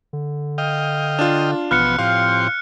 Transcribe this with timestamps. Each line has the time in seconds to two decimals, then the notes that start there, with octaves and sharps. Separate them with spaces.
0.13 D3
0.58 D#5 F5 G5
1.19 D4 F4
1.71 A1 B2 F3 B3 F6 F#6 C#7
1.99 A2 F3 C4 G4 F5